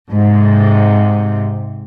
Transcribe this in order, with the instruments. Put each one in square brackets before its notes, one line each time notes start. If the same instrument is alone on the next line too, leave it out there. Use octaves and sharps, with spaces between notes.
[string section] G#2 C3